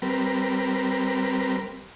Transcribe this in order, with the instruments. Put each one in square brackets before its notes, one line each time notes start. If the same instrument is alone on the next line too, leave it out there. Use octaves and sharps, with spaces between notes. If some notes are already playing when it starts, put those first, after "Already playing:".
[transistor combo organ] G3 C4 A#4 B4